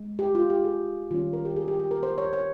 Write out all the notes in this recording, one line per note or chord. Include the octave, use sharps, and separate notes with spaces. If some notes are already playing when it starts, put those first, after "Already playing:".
Already playing: G#3
G4
F4
G4
G#4
D#3 G3 C#4 F4
A#4
G4
G#4
G4
G4
A#4
C5
C#5
C#5